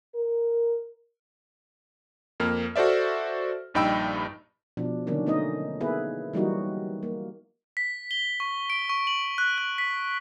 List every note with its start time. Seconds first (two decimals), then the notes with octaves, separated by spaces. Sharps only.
0.14 A#4
2.40 F2 A#3 F6
2.76 F#4 A4 C5 D5 E5
3.74 A#1 G2 D#4 G5 B5 E6
4.77 B2 F3 D4
5.07 D3 D#3 F#3 A#3 C#4 D4
5.27 A3 B3 C#4 D#4 D#5
5.80 A#3 B3 E4 G#4 B4
6.33 E3 F#3 G3 A#3 D#4 F#4
7.03 A#3
7.77 B6
8.11 G7
8.40 C#6
8.70 D7
8.90 C#6
9.07 F#7
9.38 F#6
9.58 F#6
9.78 B6